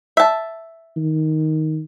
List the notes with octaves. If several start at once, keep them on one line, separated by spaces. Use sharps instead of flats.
E5 A5
D#3